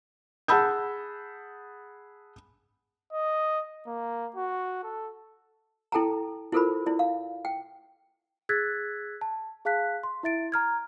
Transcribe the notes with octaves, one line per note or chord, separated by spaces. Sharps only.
G#4 F#5 A5 B5 E6 G6
D#5
A#3
F#4
A4
E4 A4 G5 A5 A#5
E4 F4 A4 A#4 C5 B5
E4 D5
F5
G5
G#4 E6 F#6 G#6 A6 B6
A5
G#4 F5 A5 F#6 B6
C6
E4 E5 A6 D7
A#5 F6 G#6